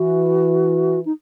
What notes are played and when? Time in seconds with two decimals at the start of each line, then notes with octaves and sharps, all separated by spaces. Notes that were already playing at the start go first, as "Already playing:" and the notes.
Already playing: E3 F#4
1.06 D#4